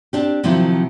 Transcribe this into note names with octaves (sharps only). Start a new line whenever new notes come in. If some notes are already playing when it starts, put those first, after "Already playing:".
C4 D4 G4
C3 D#3 F3 F#3 C4 E4